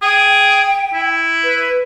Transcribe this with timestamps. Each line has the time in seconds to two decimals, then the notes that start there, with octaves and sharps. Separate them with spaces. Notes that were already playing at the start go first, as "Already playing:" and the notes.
0.02 G#4 G5
0.94 E4
1.44 B4